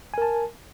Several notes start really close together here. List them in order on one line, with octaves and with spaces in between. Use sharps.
G#5 A#4 A5